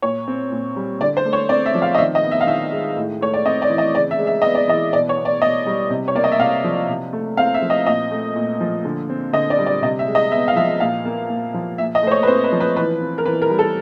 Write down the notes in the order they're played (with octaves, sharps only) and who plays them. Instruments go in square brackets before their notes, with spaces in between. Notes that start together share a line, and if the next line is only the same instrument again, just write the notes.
[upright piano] A#2 C#5
C4
A#2
G3
D3 D5
C5
A3
C#5
C4 D5
E5
F3
F5
D#5
D#3 E5
D#5
B3
E5
F5
D#3 E5
G#3
A2
A3 C#5
D5
C4 D#5
D5
E3
D#5
C#3 D5
E5
G#3
E5
B3 D#5
D5
E3 D#5
B2 D5
C#5
B3
D5
B2 D#5
G3
C3
C#5
A#3 D5
D#5
E5
C3 F5
F3
C3
A3
C4 F5
E5
F3
D#5
A#2 D#5
A3
A#2
F3
D3
C4
D3 D#5
D5
G3
D5
C3 D#5
E5
G#3
D#5
B3 E5
F5
F3 E5
A#2 F5
A#3
A#2
F3
A#2 E5
D#5
A3 C5
C#5
B4
C4 C5
B4
F3
B4
E3 B4
C4
A#4
E3 B4
A#4
G3
A4